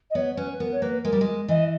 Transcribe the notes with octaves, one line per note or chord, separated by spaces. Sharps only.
D#5
B3 C#5
C#5
C#4 B4
B4
B3 A#4
C#5
A#3 B4
G#3 A#4
G3
G#3
E3 D#5